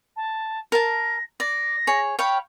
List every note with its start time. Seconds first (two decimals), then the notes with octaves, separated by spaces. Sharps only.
0.16 A5
0.72 A#4 A5 A#6
1.40 D5 A#6
1.87 G#4 C#5
2.19 C#5 F5 G5 B5